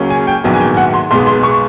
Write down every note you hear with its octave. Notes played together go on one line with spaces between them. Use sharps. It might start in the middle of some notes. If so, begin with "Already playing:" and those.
Already playing: C#2 C#3 F#3 A#3 C#4
G#5
G5
A#1 G#2 D#3 F#3 B3
G#5
G5
F#5
C6
B1 B2 G#3 B3 C6
C6
C#6